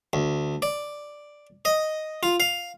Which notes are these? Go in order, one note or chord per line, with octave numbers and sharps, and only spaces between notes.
D2
D5
D#5
F4
F5